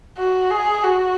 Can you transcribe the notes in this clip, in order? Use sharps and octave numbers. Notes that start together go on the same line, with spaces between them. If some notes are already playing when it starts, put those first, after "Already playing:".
F#4
G#4
F#4